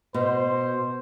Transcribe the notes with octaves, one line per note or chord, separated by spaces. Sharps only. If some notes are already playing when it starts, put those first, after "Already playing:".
B2 C5